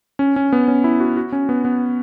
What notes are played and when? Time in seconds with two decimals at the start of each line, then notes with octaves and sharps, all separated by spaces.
0.19 C#4
0.36 C#4
0.52 B3
0.68 C#4
0.84 E4
1.00 F#4
1.17 F#4
1.32 C#4
1.49 B3
1.65 B3